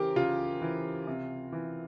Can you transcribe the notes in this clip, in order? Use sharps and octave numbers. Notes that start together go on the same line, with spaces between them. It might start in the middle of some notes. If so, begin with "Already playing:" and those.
Already playing: C#3 E3 G4 A#4 C5
C#3 F4
E3
C3
E3